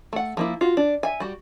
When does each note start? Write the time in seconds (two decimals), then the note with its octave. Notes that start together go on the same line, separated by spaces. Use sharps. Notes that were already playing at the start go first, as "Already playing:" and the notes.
0.13 A3 F#5
0.37 F3 A#3 E4
0.61 F4 F#4
0.77 D4
1.03 E5 G#5
1.20 G3 F#4